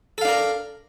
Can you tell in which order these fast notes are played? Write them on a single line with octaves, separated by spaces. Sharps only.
A4 F5 D4 A#4